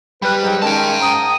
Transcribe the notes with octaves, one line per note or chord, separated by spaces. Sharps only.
G3 B4
G#2 F#3
D#3 G#3 C#4 G5 A5
G#2 A#5 D#6